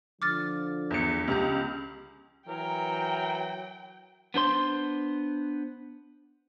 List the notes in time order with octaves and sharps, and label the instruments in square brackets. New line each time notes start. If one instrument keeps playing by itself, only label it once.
[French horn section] D3 F3 [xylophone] D6 F6 A6
[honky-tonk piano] E2 C#7
[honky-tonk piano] C#2 [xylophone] G4 A#5 G6
[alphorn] E3 [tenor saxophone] F#3 [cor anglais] A#4 [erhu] G5
[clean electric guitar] B3 D4 C5 C6